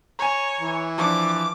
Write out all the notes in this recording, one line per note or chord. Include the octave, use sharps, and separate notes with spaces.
C#5 G#5 A#5
E3
F3 D4 D6